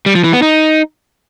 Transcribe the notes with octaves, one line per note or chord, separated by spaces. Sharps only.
G3
F3
E3
B3
D#4